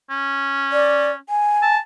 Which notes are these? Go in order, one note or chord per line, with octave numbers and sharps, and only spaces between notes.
C#4
D5
G#5
A5